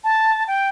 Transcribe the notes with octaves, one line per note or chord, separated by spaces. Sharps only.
A5
G5